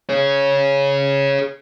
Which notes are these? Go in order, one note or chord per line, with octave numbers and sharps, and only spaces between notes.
G#4 C#5